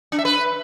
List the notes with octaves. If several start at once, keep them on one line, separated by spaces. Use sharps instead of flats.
D4
E5
B4